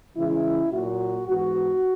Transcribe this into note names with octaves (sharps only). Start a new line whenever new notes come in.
C#3 E3 G#3 C#4 E4
A#2 F#3 A#3 F#4
G#2 E3 B3 F#4